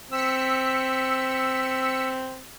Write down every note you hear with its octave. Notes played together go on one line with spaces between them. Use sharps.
C4 E6 B6 C#7